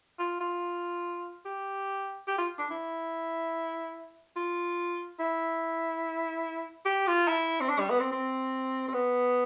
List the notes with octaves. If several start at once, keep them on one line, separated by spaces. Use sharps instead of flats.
F4
F4
G4
G4
F4
D4
E4
F4
E4
G4
F4
E4
C4
D4
G3
B3
C4
C4
C4
B3